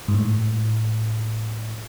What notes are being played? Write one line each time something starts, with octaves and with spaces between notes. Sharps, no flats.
G#2
A2